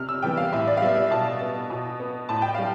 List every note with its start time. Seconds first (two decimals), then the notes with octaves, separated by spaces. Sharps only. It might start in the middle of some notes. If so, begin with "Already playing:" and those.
Already playing: C3 F6
0.09 E6
0.22 E3 G3 B3 G5
0.37 F5
0.52 A2 E5
0.67 D5
0.77 F5
0.82 G3 B3 E5
0.97 E5
1.11 B2 A5
1.41 B3
1.70 B2
2.00 B3
2.29 A2 A5
2.42 G5
2.55 G3 F5